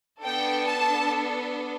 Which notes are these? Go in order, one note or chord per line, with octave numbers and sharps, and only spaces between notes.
B3 D4 A4 G5
A5